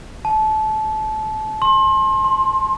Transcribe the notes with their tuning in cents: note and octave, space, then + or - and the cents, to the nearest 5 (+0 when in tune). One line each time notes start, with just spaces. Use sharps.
A5 -25
C6 +30
C6 +10